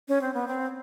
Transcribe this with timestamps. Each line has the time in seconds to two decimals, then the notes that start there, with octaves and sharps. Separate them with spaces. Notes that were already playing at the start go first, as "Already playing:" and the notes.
0.08 C#4
0.21 C4
0.34 B3
0.48 C4